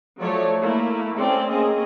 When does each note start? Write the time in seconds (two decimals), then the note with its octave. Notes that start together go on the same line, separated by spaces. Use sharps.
0.19 F3 F#3 A3 A4 C#5 D5
0.59 A3 A#3 E4
1.14 A3 C4 C#4 D5
1.48 A#3 C4 C#4 G#4 D#5